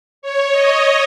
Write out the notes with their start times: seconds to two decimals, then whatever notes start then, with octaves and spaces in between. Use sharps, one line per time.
0.22 C#5
0.52 D#5